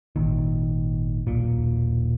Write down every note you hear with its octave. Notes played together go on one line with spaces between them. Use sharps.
G#1 A#2 D#3
D#1 B1 A#2